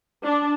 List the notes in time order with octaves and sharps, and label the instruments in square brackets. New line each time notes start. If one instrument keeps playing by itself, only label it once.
[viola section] D4